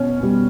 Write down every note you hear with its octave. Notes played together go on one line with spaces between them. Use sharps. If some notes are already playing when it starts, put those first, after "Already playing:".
Already playing: B2 B3 C#4
B2 G3